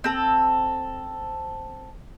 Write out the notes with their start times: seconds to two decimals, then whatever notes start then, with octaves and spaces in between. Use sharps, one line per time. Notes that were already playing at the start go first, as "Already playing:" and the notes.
0.04 C4 A4